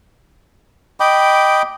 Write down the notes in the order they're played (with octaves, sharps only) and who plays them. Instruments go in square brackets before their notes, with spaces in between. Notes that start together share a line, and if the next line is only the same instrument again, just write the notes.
[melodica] D#5 G5 B5 D6